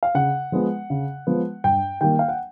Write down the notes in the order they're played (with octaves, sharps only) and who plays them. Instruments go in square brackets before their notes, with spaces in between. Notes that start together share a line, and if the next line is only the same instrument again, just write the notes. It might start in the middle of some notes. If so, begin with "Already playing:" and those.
[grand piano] F5
C#3 F#5
F3 G#3 B3
C#3
F3 G#3 B3
G2 G5
D#3 G3 A#3 G5
F5
F#5